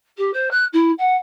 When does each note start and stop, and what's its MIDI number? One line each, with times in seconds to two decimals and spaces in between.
0.17 0.30 67
0.33 0.50 72
0.50 0.65 90
0.73 0.91 64
0.98 1.15 78